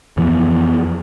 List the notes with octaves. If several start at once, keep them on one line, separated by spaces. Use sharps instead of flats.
F2 E3 F3 B3